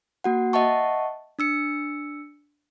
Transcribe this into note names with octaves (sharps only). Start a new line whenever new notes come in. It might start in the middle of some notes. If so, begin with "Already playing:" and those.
A#3 F#4 F#5
D#5 E5 F#5 A5 C#6
D4 E6 C#7